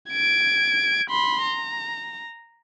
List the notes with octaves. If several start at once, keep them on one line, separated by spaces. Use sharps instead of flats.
G#6 D7
B5 C6
A#5